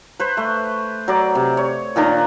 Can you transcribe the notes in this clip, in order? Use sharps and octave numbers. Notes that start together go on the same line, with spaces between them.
B4 C5
A3
F#3 D5 D6
C3
C#5
A#2 D#3 D4 A#5